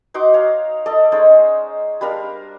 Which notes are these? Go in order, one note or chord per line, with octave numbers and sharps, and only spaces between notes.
D#4 F#4 C6 D6
C#5 F5 A#5
A4 D5 D#5
G#3 C#4 D#4 C5
G3 D4 A#4 F5